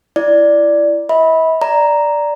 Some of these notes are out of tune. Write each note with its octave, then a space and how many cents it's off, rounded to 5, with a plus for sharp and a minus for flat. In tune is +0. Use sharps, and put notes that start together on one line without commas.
E4 +20 D5 +0
E5 -45 B5 -10
D5 +0 A#5 +0